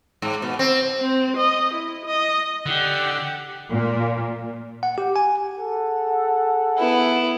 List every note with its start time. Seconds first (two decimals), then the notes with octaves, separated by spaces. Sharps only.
0.22 G#2
0.42 B2
0.59 C4
1.00 C4
1.37 D#5
1.74 E4
2.06 D#5
2.66 D3 G4 F#5
3.70 A#2
4.83 F#5
4.98 G4
5.16 G#5
5.57 G#4 A4 F#5
6.78 B3 E4